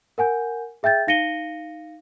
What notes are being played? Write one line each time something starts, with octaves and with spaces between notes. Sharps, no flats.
A#4 F#5 G#5 G6
G#4 E5 G5 G6 A6
D#4 F5 A#6 C#7 D#7 G7